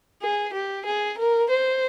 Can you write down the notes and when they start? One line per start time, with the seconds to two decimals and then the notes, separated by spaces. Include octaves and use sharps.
0.22 G#4
0.53 G4
0.85 G#4
1.18 A#4
1.49 C5